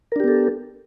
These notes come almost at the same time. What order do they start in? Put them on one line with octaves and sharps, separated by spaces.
A#4 D4 G4 B3 A4